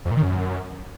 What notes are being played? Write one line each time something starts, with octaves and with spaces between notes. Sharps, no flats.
F2
A#2
D#3
F#2